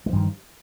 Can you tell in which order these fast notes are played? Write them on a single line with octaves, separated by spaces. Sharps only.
G#3 F3 G2 D#3